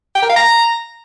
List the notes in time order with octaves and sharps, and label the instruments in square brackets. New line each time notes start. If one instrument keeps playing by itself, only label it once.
[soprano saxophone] G5
A#4
F5
A#5